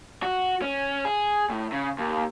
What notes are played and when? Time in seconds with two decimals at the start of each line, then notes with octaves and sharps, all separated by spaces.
0.23 F#4
0.62 C#4
1.05 G#4
1.50 A2
1.72 C#3
1.98 D#2